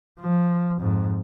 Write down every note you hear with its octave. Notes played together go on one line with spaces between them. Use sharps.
F3
F2 G#2